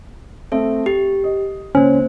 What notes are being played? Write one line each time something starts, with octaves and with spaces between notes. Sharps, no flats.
A3 C4 A4 E5
G4 C7
D#5
C#2 A#3 C#4 C5